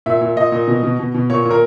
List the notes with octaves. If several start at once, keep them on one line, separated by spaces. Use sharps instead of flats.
A#2 E5
A#2
A#2 D#5
A#2
B2
B2
B2
B2
A#2 C#5
A#2
A#4